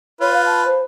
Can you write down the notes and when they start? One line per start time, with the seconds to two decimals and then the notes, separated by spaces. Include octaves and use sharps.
0.21 F4 B4 C#5
0.33 F5
0.46 A5
0.66 C5